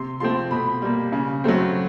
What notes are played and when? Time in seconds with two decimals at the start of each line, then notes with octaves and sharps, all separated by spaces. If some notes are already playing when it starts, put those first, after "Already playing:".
Already playing: C3 C6
0.20 F3 A3 C4 C6
0.51 B2 B5
0.82 G3 A#3
1.12 C#3
1.44 F#3 A3 C4